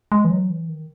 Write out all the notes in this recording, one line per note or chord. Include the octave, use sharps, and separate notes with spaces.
G#3
E3
F#3
E3
D#3